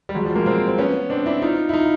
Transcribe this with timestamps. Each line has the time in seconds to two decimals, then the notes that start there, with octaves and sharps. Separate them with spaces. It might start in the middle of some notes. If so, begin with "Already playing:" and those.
0.09 G3
0.15 F#3 G#3
0.25 F3 G3
0.35 G#3 A#3
0.46 A#3 C4
0.68 C4
0.78 B3 C#4
1.10 C4 D4
1.26 D4 E4
1.42 D#4 F4
1.69 E4
1.73 D#4 F4